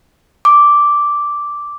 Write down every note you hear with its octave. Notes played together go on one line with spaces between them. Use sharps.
D6